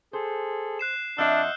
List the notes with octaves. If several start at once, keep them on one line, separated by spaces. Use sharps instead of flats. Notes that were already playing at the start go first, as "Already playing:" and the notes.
G#4 A4 C5
F#6 C7 E7
F2 D4 D#5 E5 F#5 E6 F6 G6